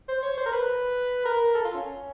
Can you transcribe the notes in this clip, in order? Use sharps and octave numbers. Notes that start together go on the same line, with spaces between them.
C5
C#5
C5
A#4
B4
A#4
A4
F4
C#4